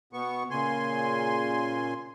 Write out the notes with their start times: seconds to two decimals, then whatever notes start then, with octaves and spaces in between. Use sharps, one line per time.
0.13 B2 B3 C#6
0.50 A#2 C#3 G#5 C6